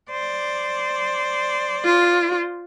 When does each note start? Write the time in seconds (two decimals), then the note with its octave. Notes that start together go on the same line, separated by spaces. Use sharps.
0.11 C5 D5
1.85 F4